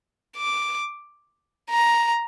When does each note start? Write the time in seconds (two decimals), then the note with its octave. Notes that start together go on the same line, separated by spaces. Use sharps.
0.37 D6
1.70 A#5